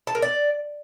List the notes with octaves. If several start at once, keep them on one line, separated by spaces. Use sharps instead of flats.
A5
A#4
D5